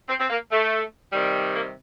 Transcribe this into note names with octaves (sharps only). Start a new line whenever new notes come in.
C4
C4
A#3
A3
C3 D#3 G3
A#3